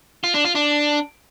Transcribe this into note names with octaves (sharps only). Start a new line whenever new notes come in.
F4
D4
F4
D4